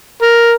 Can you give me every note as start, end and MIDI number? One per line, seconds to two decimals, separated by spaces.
0.22 0.52 70